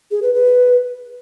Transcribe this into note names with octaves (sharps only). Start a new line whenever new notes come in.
G#4
B4
B4